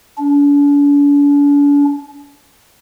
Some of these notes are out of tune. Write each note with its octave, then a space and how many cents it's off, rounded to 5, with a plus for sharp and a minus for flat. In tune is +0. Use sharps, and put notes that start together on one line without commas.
D4 -45